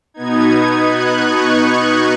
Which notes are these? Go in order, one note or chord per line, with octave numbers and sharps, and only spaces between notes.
B2 B3 D#4 G#6
F#6
C#6